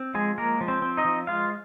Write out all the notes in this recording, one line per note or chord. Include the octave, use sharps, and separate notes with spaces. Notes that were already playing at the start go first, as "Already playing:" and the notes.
Already playing: C4
F3 G#3 G#4
G#3 A#3 A#4
F3
C4 C5
C4
D#4 D#5
F3
G#3 F4 F5